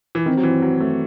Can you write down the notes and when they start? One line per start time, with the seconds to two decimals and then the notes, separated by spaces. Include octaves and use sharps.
0.15 E3
0.26 D#3 C4
0.37 F#3
0.43 E3
0.62 F#3
0.80 A3